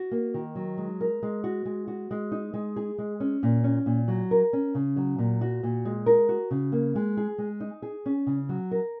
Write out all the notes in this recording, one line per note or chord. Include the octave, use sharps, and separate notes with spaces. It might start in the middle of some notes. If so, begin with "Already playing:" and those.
Already playing: F#4
A#3
D#3
F#3
G#3
A#4
G#3
F#4
G#3
F#4
G#3
D#4
G#3
G#4
G#3
C#4
A#2
C#4
A#2
F#3
A#4
C#4
C#3
F#3
A#2
F#4
A#2
G#3
A#4
F#4
C#3
A#3
G#3
G#4
G#3
D#4
G#4
C#4
C#3
F#3
A#4